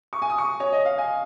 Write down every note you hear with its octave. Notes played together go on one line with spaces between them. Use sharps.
C#6
G#5
D#6
C#6
C#5
D#5
F5
G#5